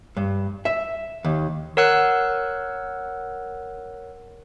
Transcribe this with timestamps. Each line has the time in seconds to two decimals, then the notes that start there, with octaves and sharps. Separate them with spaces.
0.17 G2
0.65 E5
1.25 D#2
1.77 A#4 C#5 F#5 E6 F#6